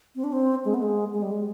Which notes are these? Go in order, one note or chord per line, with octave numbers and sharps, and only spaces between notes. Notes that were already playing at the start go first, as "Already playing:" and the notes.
C4
D4
C4
G#3
B3
G#3
G#3
G3
G#3